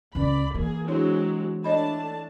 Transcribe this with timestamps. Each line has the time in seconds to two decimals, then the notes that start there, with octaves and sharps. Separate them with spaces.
0.15 C#2 C#4 D5 B5
0.54 E3 A#3 G#4
0.88 F#3 G#3 C4 D4 E4 C#5
1.64 A3 D4 C#5 D#5 A5 B5